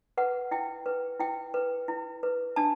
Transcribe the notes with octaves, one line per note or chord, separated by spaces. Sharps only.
B4 F#5
E4 G5
B4
E4 G5
B4
E4
B4
D4 A5